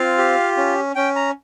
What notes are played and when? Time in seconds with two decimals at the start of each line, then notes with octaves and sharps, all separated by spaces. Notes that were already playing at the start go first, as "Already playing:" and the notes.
Already playing: C4 F4 F5
0.18 G4
0.57 C#4
0.95 C#4 G5
1.16 A#5